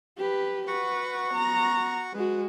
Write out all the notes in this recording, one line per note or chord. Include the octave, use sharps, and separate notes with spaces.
G4 B4
F#4 B4 F#5 C#6
B3 A#5
G#3 F#4 B4